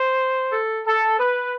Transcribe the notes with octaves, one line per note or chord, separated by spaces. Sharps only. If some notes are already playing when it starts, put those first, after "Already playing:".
Already playing: C5
A4
A4
B4